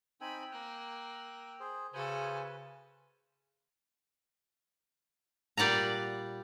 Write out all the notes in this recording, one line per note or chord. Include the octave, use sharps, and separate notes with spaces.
C4 D#4 G5 G#5 B5 E6
A#3 F#6
G#4 C5
C#3 F#4 A4 B4 C5 G#5
A#2 G3 D5 F#5 A#5